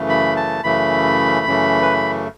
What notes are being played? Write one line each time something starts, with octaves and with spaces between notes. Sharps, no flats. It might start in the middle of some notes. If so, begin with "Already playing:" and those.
Already playing: F#2 C#3 E3 A3
B5
A5
F#2 C#3 E3 A3 B5
F#2 C#3 E3 A3
B4